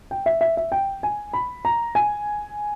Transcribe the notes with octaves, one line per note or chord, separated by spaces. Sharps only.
G5
E5
E5
E5
G5
G#5
B5
A#5
G#5